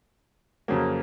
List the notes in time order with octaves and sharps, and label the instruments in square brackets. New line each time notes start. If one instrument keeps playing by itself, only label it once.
[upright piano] F2 C#3 F#3 A#3